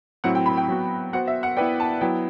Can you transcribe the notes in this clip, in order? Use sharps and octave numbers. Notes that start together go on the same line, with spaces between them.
A2 F#3 C4 E4 F#5
G5
B5
G5
F#3 B3 F#4
B3 F#4 C5 F#5
E5
F#5
B3 E4 B4 D5 G5
A5
F#3 B3 E4 G5